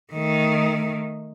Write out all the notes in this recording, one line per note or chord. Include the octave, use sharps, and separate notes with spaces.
D#3 A3